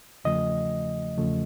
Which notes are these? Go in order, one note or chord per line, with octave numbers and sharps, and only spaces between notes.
E2 C#3 F3 A3 D#5
E2 C#3 F3 A3